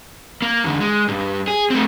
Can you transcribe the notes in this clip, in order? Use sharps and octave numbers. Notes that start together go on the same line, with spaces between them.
A#3
E2 D3
G#3
B1 G2
G#4
A3 C4